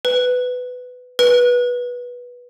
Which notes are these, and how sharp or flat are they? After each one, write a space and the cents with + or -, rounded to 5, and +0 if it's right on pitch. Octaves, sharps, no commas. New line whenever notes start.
B4 +15
B4 -15